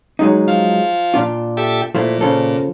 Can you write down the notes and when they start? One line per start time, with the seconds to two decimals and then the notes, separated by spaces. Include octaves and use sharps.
0.19 F#3 G#3 D#4
0.48 F3 F5
1.14 A#2 D4 F4
1.57 G4 A4 E5
1.95 A#2 F3 A3 E4
2.21 C#3 F3 A4